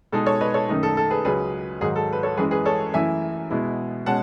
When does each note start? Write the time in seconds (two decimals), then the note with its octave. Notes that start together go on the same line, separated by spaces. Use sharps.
0.12 B2 G#3 D#4 A4
0.26 A4 C#5
0.41 B4 D#5
0.54 A4 C#5
0.69 F#2 D#3 A3 D#4
0.83 A4
0.97 A4
1.10 G#4 B4
1.25 C#2 C#3 F#3 G#4 B4
1.81 G#2 D#3 F#3 G#4
1.96 A4
2.13 B4
2.23 A4 C#5
2.37 F#2 E3 G#3 G#4 B4
2.51 G#4 B4
2.65 A4 C#5
2.93 F#2 E3 A3 E4 E5 G#5
3.51 B2 G#3 B3 E4
4.06 B2 G#3 C#4 F#5 A5